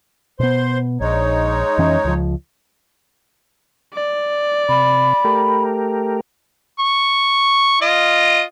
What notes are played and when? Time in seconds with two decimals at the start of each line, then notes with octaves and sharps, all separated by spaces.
0.40 B2 B3 C5 C6
1.01 A#1 G#3 D#4 C#5
1.78 F2 E3 C#4
2.05 C#2 F3
3.94 D5
4.69 C3 B5
5.25 A3 G4 A#4
6.80 C#6
7.81 F4 D#5